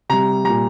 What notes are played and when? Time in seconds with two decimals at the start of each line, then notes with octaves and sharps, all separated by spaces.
0.09 C3 G3 A#5
0.44 A#2 G3 A#5